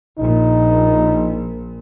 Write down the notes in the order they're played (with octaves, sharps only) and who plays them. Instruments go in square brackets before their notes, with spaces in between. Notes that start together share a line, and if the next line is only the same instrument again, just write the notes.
[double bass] A#1 A#2 [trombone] D#4